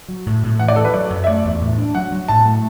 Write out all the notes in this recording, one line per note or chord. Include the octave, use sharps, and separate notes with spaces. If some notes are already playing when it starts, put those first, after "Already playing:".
F#3
A2
A2
E3 F#5
D5
E3 A4
B4
F#3 D5
F#2
E5
A3 D5
E2
A2
D4
F#3 F#5
F#3
A2 A5
A3